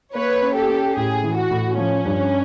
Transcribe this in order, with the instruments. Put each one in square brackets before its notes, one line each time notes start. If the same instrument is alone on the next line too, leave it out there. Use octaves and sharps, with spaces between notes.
[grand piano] A#3 [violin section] B4 C#5
[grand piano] C#4
[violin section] G4 A4
[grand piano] C#4
[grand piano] A2 [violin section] G#4
[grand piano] E3
[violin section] F#4
[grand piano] A2
[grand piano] F3 [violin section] C#4
[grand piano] G2